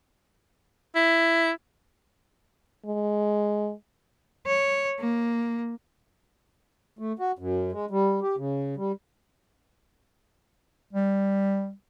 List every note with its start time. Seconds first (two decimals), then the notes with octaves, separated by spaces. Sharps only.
0.95 E4
2.86 G#3
4.46 C#5
4.99 A#3
6.99 A3
7.19 F#4
7.39 F#2
7.72 G#3
7.91 G3
8.22 G4
8.37 C#3
8.77 G3
10.93 G3